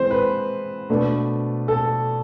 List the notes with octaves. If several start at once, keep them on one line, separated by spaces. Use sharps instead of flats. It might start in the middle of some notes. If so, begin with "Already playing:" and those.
Already playing: E3 G#3 C4 C5
B4
B2 A3 D4
A4